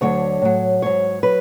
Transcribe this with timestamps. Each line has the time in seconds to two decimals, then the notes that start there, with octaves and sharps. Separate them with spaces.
0.01 D2 D3 F#3 C#5
0.42 A2 F#3
0.82 G#2 F#3 C#5
1.23 F#3 B4